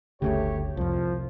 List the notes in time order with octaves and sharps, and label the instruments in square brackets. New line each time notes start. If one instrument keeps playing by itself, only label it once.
[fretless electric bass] G1 D2 C#3 [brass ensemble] A3 G4 C#5
[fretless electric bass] C2 F2 [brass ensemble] F3